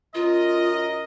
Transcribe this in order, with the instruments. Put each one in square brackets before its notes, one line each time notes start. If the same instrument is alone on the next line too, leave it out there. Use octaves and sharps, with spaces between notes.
[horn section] F#2 A#4 D#5 [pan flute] F4